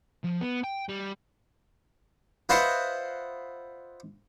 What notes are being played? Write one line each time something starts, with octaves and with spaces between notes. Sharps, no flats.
F3
B3
G5
G3
F4 B4 C5 D#5 E5 F#5